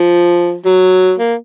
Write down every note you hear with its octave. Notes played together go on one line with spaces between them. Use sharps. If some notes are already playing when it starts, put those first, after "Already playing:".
Already playing: F3
F#3
A#3